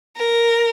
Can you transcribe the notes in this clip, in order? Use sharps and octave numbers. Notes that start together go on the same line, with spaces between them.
A#4